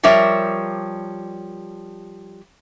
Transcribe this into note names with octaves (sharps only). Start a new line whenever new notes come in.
F3 G3 A#4 C#5 E5